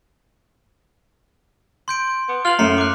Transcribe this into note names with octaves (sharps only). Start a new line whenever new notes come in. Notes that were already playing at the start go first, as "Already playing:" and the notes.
C6 G6 D7
B3
F4 F6 F7 F#7
F#2 A2 A3 A#5 C7 G7
D6 F#6